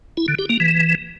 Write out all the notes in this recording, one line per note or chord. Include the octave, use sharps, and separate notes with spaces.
E4
D3
G4
A#3
E3